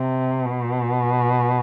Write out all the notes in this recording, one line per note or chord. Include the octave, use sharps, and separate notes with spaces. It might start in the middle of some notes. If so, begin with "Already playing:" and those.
Already playing: C3
B2